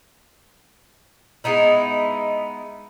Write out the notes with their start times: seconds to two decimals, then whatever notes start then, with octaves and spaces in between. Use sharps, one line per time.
1.44 G#3 B3 D#4 E4